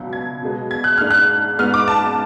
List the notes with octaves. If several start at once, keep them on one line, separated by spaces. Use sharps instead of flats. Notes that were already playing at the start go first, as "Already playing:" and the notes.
Already playing: C#2 B2 F#3 B3 D4
G#6
B2 G#3 B3
G#6
F#6
G#2 G#3 D4 F6
F#6
G#2 G#3 B3 F6
D6
A5